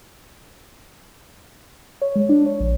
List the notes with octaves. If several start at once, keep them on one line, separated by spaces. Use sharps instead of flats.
C#5
G#3
D4
C#5
A#1